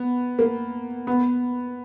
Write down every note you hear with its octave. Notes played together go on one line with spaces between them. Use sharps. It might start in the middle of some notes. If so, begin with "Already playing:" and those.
Already playing: B3
A#3
B3